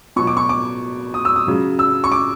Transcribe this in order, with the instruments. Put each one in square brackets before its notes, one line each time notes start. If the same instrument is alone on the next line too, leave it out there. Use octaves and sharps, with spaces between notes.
[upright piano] B2 F#3 C#6
D6
C#6
D6
D#6
E6
D#6
C#3 F#3
E6
C#6
D6